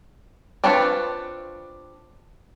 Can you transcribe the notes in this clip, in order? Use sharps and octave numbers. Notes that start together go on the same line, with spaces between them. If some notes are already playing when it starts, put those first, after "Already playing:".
C4 D4 F4 B4 C#5